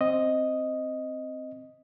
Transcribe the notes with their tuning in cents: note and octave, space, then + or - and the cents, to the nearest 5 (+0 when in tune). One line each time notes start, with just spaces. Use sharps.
C4 +0 D#5 +0